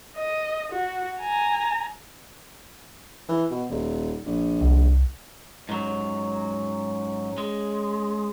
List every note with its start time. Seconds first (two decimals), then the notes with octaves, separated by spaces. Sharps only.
0.16 D#5
0.72 F#4
1.21 G#5 A#5
3.29 E3
3.51 B2
3.69 D#1
4.26 A#1
4.61 C2
5.69 G#2 F#3 C#4
7.38 G#3